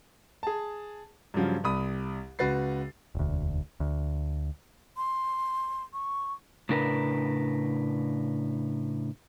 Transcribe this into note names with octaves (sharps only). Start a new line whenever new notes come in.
G#4 A5
G2 C#3 F3 F#3
C2 B5 D#6
C#2 F#4 B4 A6 C7
E1 D2
D2
C6
C#6
A2 C#3 D4 A#4 B4